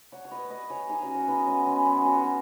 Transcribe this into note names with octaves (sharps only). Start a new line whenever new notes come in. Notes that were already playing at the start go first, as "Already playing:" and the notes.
C#5 F#5
C#5
B4 D#5
B4 D#5
G#4 C#5
D#4 G#4
C#4 F#4
C#4 F#4
B3 D#4
G#3 C#4
G#3 C#4
B3
G#3 C#4
G#4 C#5
F#4 B4
G#4 C#5
B3 D#4